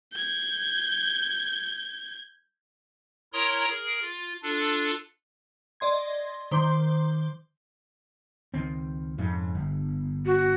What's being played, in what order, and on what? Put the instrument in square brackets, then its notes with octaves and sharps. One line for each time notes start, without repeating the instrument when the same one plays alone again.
[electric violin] G6 G#6
[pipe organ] E4 A#4 C#5 A#5 C6 D#6
G#4 A#4
F4
D4 F4 A4
[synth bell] D5 D#5 C6 G#6
D#3 C5 C6 D6 G6
[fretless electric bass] C#2 D#3 C4
F2 G#2 C#3
G1
[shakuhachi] F#4